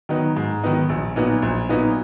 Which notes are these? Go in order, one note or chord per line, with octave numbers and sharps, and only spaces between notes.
D#3 F#3 B3 D#4
G#2
D#3 F#3 B3 D#4
A#1
A#2 F#3 B3 D#4
A#1
A#2 F#3 B3 D#4